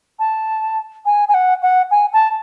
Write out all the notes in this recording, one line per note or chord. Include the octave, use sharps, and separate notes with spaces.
A5
G#5
G#5
F#5
F#5
G#5
A5